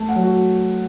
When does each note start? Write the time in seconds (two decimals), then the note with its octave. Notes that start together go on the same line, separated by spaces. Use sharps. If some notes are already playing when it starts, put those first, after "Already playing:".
Already playing: A3
0.09 F#5
0.16 F#3
0.23 F#4